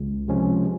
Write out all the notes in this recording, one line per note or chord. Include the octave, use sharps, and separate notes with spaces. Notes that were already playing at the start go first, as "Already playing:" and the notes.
Already playing: C#2
C3 F3 G#3 C#4